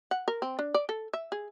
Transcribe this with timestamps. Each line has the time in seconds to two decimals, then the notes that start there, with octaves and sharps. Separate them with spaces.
0.11 F#5
0.28 A#4
0.42 C4
0.59 D4
0.74 D5
0.89 A4
1.13 E5
1.32 G#4